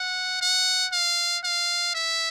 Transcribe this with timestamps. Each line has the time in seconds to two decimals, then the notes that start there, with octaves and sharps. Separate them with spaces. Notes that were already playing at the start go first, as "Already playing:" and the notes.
Already playing: F#5
0.41 F#5
0.92 F5
1.44 F5
1.95 E5